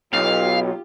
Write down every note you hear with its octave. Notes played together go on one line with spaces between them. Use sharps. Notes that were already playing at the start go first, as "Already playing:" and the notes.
B1 F4 G4 F5